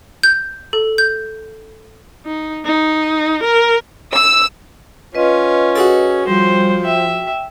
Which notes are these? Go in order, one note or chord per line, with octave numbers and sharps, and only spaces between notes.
G6
A4
G6
D#4
D#4
A#4
E6
C#4 F4 B4 D#5
F#4 G#4 A4
F3 G3 C5 G5
E5 G5